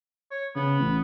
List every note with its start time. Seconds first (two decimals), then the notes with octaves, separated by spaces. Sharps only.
0.31 C#5
0.56 C#3 B3
0.80 A1